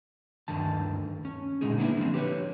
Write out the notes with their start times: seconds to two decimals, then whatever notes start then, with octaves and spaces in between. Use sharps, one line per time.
0.48 D2 G2 D3 D#3 A5
1.25 C#4
1.61 A#2 D3 G#3 D#4 G#4
1.77 G3 A#3 B3 D4 E4
1.97 D3 F3 C4
2.14 G4 B4 C#5